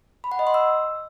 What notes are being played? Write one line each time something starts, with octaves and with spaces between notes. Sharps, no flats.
B5
F#5
D#5
C6
E6